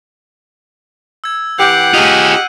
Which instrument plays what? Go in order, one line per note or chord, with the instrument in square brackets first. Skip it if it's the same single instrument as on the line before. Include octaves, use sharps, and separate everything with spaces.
[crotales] E6 G#6
[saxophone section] E3 G4 [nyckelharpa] F#5 [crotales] G6 C7 D7
[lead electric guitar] F4 G#4 [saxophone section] G4 D#5 [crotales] F6 D#7